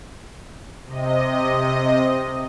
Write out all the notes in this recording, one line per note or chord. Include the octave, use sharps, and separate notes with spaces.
C3 D#5